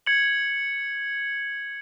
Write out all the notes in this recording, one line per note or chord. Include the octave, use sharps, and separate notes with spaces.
G#6 C#7 F#7